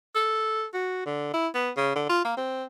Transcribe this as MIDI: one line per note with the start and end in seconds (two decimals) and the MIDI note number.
0.15 0.65 69
0.73 1.01 66
1.06 1.32 50
1.33 1.48 64
1.55 1.70 59
1.77 1.90 49
1.95 2.09 50
2.09 2.20 65
2.25 2.36 58
2.37 2.64 60